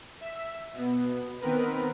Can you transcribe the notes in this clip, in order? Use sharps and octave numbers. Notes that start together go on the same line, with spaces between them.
E5
B2 B3
D#3 B3 C4 A#4 B4